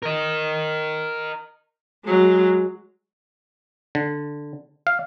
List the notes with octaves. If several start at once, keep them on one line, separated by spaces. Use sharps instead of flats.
A#4 D#5
F#3 G#3
D3
F5